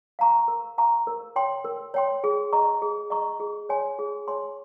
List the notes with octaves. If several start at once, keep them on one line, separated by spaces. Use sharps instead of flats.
F5 A#5 C#6
A#4
F5 A#5 C#6
A#4
C#5 G5 C6
A#4
C#5 G5 C6
G#4
D#5 A#5 C#6
G#4
D#5 A#5 C#6
G#4
C#5 G#5 C6
G#4
C#5 G#5 C6